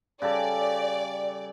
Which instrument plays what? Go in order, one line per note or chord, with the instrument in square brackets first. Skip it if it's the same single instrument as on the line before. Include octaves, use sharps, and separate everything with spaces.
[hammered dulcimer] C#3 G3 A4 [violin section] D5